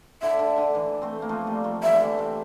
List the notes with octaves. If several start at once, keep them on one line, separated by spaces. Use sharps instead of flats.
D3 E5
D3
D3
E3
A3 C4
A#3
F3 A3
G3 A#3
F3 A3
E3 G3 E5
D3
E3
C3